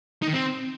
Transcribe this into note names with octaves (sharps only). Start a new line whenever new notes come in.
D#4
D#3
C4